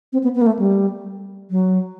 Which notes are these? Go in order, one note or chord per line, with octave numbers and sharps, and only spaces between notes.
C4
B3
B3
A#3
A3
G3
F#3